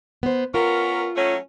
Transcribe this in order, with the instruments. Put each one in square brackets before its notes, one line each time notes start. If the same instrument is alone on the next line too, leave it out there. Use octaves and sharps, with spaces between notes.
[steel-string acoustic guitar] B3 C5
[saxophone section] B3 C#4 A#4 [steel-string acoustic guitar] F4
[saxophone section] F#3 A3 C#4